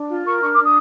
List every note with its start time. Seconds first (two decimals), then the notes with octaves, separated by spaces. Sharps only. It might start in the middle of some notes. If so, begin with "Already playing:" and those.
Already playing: D4
0.08 F4
0.24 A#4 C#6
0.41 D4 C#6
0.52 D6
0.58 D4 D#6